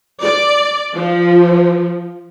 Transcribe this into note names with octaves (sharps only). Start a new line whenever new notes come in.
D5
F3